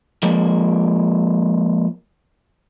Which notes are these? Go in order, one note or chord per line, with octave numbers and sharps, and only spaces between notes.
F3 G#3 A#3